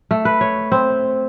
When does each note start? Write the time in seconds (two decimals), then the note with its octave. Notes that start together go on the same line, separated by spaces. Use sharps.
0.11 A3
0.25 B4
0.41 C#5
0.72 C4